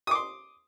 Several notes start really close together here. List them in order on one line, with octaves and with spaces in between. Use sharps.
D#6 D6 C6